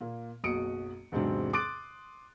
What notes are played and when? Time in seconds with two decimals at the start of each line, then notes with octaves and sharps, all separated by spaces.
0.01 A#2 A#3
0.44 F#1 B1 F#4 D#6 C#7 D7
1.12 E2 G#2 C3 F#3 C4 D4
1.53 C6 D6 D#6 F#6 A6 D7